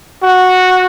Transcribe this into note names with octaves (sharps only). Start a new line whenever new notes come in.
F#4